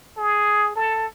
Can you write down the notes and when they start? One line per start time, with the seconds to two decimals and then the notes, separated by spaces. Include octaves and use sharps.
0.17 G#4
0.76 A4